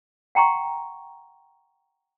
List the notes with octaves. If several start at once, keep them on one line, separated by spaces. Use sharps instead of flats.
F#5 G5 A#5 C6 C#6